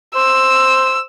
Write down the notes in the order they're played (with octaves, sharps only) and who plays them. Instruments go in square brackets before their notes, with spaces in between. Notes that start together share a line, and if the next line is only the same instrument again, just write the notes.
[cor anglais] C5 [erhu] E6